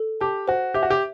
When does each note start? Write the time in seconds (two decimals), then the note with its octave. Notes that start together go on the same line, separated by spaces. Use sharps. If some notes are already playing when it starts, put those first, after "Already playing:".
Already playing: A4
0.21 G4 A5
0.48 F#4 C5
0.74 G4 E5
0.83 F#4
0.90 G4